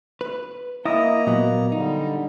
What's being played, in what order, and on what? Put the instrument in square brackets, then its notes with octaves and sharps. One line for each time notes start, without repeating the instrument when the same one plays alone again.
[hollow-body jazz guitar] B4
[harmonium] A#3 A#5 [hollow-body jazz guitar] E4 [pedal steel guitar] D#5 D#6
[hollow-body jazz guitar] A#2 F#3 B3
[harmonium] D3 G3 [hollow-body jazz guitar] D#4